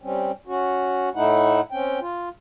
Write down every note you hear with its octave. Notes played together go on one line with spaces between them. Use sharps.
G3 C4 C#4
C#4 F#4
A2 A3 D#4 E4 F#5
C4 C#4 G5
F4